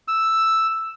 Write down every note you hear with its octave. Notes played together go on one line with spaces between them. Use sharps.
E6